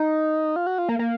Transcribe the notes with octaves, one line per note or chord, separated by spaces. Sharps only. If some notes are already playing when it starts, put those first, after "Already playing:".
Already playing: D#4
F4
F#4
F4
A#3
A#3